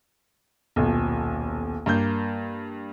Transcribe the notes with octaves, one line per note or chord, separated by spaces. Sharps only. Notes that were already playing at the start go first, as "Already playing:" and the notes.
D#1 B1
G2 A#3 G6